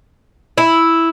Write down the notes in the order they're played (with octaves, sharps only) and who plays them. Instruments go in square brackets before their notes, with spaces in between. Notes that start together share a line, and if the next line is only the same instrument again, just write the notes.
[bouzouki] E4